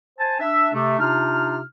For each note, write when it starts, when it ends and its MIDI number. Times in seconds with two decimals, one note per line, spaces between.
0.19 0.38 72
0.19 0.38 80
0.19 0.38 81
0.40 0.69 62
0.40 0.69 76
0.74 0.98 48
0.74 0.98 57
0.99 1.59 48
0.99 1.59 62
0.99 1.59 63
0.99 1.59 65
0.99 1.59 89